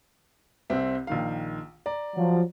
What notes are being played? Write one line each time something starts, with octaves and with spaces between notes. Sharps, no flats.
C2 C4 E5
A#1 D#3 F5
D5 A#5
F3 F#3